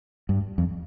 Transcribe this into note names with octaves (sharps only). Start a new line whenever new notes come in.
G2
F2